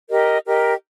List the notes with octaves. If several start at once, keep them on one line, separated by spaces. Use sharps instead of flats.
G4 A#4 D#5
G4 A#4 D#5